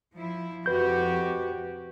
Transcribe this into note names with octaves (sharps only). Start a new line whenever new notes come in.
F3 E4
F2 F#4 G4 B4 G6